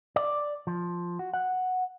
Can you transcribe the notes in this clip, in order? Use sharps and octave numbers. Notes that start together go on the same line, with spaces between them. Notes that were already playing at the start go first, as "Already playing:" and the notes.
D5
F3
F#4
F#5